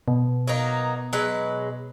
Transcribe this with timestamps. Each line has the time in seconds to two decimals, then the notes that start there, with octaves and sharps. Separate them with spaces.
0.08 B2
0.47 F#3 A#3 D#4
1.13 F#3 G#3 B4